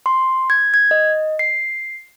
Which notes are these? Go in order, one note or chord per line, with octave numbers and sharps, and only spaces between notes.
C6
G#6
G#6
D#5
C7